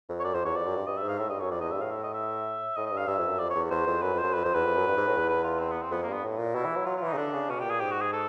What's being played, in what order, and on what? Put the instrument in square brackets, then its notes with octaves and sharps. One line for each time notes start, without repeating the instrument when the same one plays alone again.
[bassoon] F2
[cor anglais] C#5
[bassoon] F#2 [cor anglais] D5
[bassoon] F2 [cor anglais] C5
[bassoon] E2 [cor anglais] C#5
[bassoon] F2 [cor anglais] D5
[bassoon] F#2
G2
[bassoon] G2 [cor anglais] D#5
[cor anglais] E5
[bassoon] G#2
[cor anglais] F5
[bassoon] A2 [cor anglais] E5
[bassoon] G2 [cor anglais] D#5
[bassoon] F#2 [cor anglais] C#5
[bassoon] F2 [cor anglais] D5
[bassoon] E2 [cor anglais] D#5
[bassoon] G2 [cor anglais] E5
[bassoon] A2 [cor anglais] F5
[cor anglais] E5
D#5
E5
[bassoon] A2 [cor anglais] D#5
[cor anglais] D#5
[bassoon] G2
[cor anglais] F5
[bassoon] G2 [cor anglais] E5
[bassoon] F2
F#2
[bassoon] F2 [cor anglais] D5
[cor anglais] C#5
[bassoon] E2
[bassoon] E2 [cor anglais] C5
[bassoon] F2
[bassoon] F#2 [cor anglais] B4
[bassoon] F2
[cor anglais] C5
[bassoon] F#2
[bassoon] F2 [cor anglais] B4
[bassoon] F2 [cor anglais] C5
[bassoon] E2 [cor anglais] B4
[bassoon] F2
F#2
G2
G#2
A2
E2
[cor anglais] B4
F4
C4
B3
C4
[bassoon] F2 [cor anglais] B3
[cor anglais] A#3
[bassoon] G2 [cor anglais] B3
[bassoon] A2
A#2
[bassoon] B2 [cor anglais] E4
[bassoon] E3
F#3
[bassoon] F#3 [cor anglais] F4
[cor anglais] F4
[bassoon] E3
[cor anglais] D#4
[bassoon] C#3
[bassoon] D3 [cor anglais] D4
[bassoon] C#3
[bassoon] B2 [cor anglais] C#4
[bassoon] A#2 [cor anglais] G4
[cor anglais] G#4
[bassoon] G#2 [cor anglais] G4
[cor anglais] F#4
G#4
A4